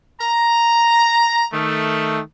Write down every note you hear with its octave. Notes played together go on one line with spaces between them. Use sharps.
A#5
D#3 A3